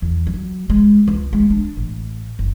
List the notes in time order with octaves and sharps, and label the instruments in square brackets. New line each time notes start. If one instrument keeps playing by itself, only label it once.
[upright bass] E2
F#3
G#3
C#2
G#3
D4
A1
F#1